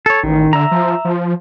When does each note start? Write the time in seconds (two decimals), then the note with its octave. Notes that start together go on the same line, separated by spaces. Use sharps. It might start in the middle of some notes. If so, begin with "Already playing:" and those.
0.06 A4 C#5
0.23 A1 D#3
0.53 D3 E5 A#5
0.71 F3
1.05 F3